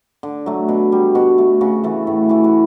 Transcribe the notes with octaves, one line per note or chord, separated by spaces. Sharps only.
D3
F#3 A3
B2
G3
B2 F#4
A3
C#3 F#4
E3 A3
A2
E3 A3
F#4